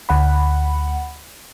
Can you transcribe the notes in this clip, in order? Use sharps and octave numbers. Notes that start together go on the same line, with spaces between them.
D2 F#5 B5